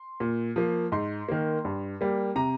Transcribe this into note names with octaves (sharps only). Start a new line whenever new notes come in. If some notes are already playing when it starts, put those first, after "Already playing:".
Already playing: C6
A#2
F3 A#3
G#2 C6
D#3 A#3
G2
G3 A#3
C3 A#5